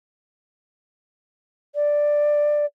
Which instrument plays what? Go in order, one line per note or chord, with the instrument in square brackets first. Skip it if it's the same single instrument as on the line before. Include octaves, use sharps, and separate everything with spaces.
[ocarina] D5